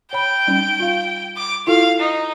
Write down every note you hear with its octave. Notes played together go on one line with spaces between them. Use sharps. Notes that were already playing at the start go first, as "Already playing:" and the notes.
C#5 G5 B5
G3 C#4 D#4
F4 F5
D6
E4 F4 A4 F5
D#4